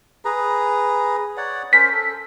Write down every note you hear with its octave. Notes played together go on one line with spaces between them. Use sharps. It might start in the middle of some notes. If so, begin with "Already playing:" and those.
G#4 B4 A#5
C#5 D5 F#5
C#4 A#4 C5 B6
A4